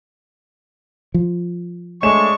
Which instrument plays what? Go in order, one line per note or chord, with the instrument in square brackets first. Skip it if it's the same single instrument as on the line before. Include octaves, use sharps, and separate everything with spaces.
[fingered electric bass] F3
[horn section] G#3 D4 [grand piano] A3 C#5 E7 [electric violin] C#6